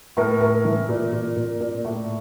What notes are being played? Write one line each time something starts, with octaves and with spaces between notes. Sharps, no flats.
A2 A#4
A2 A#4
E3
A#2
A#2
A#2
A#2
A2